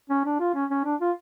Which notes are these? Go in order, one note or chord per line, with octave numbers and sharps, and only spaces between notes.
C#4
D4
F4
C#4
C#4
D4
F4